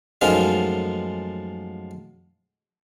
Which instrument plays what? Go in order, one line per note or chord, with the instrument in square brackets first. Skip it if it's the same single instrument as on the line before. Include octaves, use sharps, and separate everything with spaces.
[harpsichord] F#2 A2 F3 G#3 D#4 F4